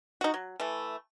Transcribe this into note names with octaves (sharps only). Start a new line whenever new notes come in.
D#4 F#4
F#3
E3 A3